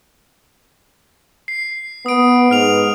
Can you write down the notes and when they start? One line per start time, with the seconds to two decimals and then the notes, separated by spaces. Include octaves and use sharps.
1.48 C7
2.06 B3 D#6 D7
2.51 G#2 F6 F7